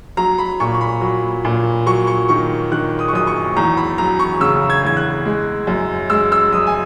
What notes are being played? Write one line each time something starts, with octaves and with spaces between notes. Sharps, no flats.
F#3 A#5
B5
A#2 C#6
C#6
B5
F#3
A#2
F#3 C#6
C#6
D#3 C#6
D#3 F#6
D#6
C#6
F#2 D#6
C#6
E2 A#5
B5
F#3 A#5
C#6
C#3 E6
G#6
E2 G#6
F#6
G#3
F#2
G#3 E6
E6
F#2 D#6
G#5